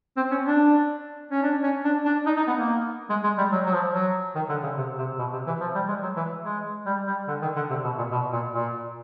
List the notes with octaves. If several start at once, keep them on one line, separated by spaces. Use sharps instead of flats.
C4
C#4
D4
C#4
D4
C#4
D4
D4
D#4
D#4
B3
A#3
G#3
G#3
G3
F#3
F#3
F3
F#3
D#3
D3
C#3
C3
C3
B2
C3
E3
F3
G3
G#3
F#3
E3
G#3
G3
G3
D3
D#3
D3
C3
B2
A#2
B2
A#2
A#2